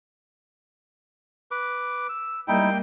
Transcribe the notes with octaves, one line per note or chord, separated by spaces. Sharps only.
B4 D6
E6
G3 A#3 D#4 E4 G5